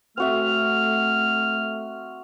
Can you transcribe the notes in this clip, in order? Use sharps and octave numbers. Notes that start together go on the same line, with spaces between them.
A3 C4 F#4 E5 F6